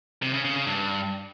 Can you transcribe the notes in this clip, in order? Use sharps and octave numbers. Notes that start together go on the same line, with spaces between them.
C3
C#3
C#3
C#3
G2